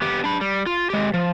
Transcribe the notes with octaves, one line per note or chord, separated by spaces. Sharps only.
B3 G4
D4 B5
G3
F4
G#3 G4
F3